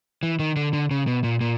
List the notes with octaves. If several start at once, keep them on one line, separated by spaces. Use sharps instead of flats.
E3
D#3
D3
D3
C#3
B2
A#2
A#2